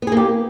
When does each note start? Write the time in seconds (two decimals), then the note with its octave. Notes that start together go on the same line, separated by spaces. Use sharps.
0.02 B3
0.07 G#4
0.12 A#3
0.17 G4